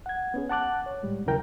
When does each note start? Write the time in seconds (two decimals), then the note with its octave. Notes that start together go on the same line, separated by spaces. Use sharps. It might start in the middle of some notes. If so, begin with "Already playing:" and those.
0.06 F#5 G#6
0.34 B3 C#4 G#4
0.49 F#5 A5 D6 F#6
0.86 C#5
1.03 A2 G3 G#3
1.26 D#2 C#3 F#3 E4 A#4 G5